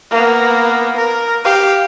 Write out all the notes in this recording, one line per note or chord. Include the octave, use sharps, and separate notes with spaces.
A#3 B3
A#4
G4 F5